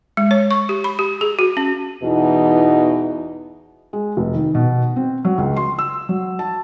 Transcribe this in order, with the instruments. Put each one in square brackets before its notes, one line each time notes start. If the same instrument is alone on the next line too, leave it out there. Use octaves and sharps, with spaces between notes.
[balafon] G#3
C#5
C#6
G4
B5
G4
G#4
F#4
C#4
[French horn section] E2 B2 E3 D#4
[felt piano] G#3
F1
D#3
B2
C4
F#3
C#2
C6
E6
F#3
A5